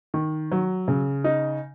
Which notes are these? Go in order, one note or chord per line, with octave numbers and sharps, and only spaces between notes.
D#3
F#3
C#3
D#4